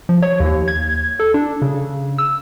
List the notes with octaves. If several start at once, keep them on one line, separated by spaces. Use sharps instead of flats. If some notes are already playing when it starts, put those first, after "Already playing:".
F3
C#5
D#2
G#6
A4
D4
C#3
E6